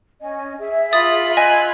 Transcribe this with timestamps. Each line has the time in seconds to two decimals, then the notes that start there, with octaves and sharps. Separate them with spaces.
0.20 C#4 D#5 G#5
0.60 G#4 E5
0.93 F4 B5 D#6 A6
1.37 D#5 G#5 E6 F#6 G#6